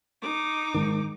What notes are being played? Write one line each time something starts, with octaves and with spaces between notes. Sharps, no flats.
D#4 D6
G#2 D#3